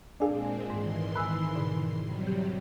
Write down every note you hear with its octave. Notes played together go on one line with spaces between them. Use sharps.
A#2 G#3 C4 D4 G#4 F5 G#5
G#2 D#3 E3 C6
G#5 B5 E6 F#6
G#2 B2 D3
C3 F#3 G3
G4